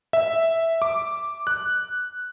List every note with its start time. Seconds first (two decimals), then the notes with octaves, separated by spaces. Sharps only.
0.13 E5
0.82 D6
1.47 F#6